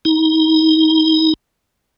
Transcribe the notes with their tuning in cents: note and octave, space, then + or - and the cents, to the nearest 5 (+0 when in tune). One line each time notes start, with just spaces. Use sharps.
D#4 +30